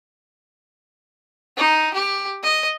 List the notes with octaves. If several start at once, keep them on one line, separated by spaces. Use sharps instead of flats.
D#4
G4
D#5